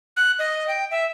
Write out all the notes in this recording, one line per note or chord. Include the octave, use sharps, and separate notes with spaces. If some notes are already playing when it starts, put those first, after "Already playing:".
F#6
D#5
G5
E5